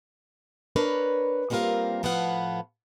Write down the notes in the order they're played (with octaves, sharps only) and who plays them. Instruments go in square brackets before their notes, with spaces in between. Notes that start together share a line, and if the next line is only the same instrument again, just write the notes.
[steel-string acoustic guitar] D4 A#4 B4 C#5
G3 A#3 C4 F4 A#4 F5
A2 F3 B3 B4 F5 F#5